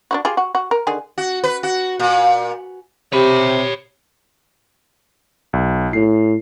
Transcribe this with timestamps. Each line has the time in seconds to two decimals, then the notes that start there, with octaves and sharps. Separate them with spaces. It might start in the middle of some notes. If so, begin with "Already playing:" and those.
0.11 D4 E4 F#4
0.25 F4 G4 G#4
0.37 F#4
0.55 F#4
0.71 A#4
0.87 D3 D#3 G#4
1.18 F#4
1.44 B4
1.63 F#4
1.99 A#2
3.12 C3 G4 C#5 B5
5.53 B1
5.93 A2 C7